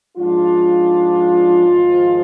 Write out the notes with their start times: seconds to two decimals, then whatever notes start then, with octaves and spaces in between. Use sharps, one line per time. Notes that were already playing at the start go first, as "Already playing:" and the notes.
0.17 G#2 F3 G#3 D4 F4
1.66 G#1 G#2 F3 G#3